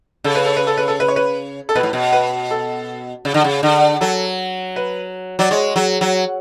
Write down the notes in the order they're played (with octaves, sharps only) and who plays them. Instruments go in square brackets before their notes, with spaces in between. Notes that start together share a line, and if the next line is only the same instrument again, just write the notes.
[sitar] C#3 [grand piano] A4
[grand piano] B4
A4
B4
A4
B4
A4
B4
C#5
B4
A4
[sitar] B2 [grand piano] B4
[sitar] A2
B2
[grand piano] B4
A4
[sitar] C#3
D3
C#3
D3
[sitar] F#3 [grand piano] A4
[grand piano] B4
[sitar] F#3 [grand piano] D5
[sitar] G#3 [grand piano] C#5
[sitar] F#3
F#3